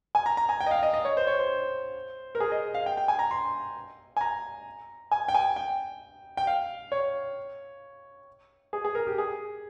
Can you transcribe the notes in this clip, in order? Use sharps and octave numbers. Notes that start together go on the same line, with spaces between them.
G#5
A#5
A#5
G#5
G5
D#5
F5
D#5
D#5
C#5
C5
C#5
C5
A#4
G#4
D#5
F5
G5
G5
G#5
A#5
C6
G#5
A#5
G#5
G5
G#5
G5
G5
F5
C#5
G#4
G#4
A#4
G4
G#4